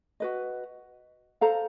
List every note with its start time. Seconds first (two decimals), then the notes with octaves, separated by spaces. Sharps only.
0.20 F#4 B4 D#5
1.41 A4 C5 F5 A#5